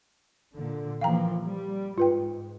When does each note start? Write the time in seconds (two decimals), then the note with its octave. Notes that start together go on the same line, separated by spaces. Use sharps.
0.54 A#2 D3
1.01 E3 F3 A#3 F5 G5 A#5
1.44 G3
1.98 G#2 F4 B4 G5